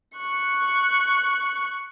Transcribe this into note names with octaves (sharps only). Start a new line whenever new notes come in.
C#6 F#6